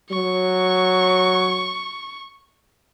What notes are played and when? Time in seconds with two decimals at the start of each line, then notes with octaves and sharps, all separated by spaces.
0.11 F#3 C#6